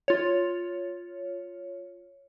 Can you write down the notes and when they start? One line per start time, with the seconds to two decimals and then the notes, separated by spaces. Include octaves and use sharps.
0.08 F4 C#5